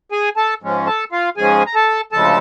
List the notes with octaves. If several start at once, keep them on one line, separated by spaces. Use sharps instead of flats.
G#4 G#5
A4 A5
G#2 F3 G#3 C#4
A4 A5
F4 F5
G#2 F3 G#3 C#4 G#4 G#5
A#5
A4 A5
D2 C#3 F3 G#3 A4 A5